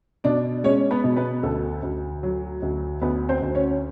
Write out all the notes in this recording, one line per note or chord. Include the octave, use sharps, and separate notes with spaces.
B2 D4 D5
G#3 C#4 C#5
B3 B4
B2
B3 B4
D2 A4
D2
F#3
D2
D2 B3 B4
C4 C5
D2
C#4 C#5